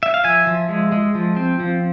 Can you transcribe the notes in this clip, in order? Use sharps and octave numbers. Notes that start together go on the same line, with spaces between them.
E5
F5
F3 E5 G#5
F3
G#3
G#3
F3
C4
F3